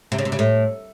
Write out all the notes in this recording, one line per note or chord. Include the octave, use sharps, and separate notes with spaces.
C3
C#3
C3
C#3
A2